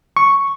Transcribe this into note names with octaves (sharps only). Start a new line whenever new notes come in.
C#6